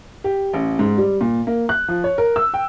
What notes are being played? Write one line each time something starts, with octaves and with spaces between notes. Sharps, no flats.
G4
A1
G#2
G3
A#2
A#3
F#6
F3
C#5
A#4
E6
G5